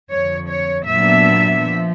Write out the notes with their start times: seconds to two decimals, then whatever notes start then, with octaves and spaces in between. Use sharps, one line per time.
0.10 F2 D3 F3 C#5
0.49 C#5
0.87 A#2 F#3 B3 D4 E5
1.64 F3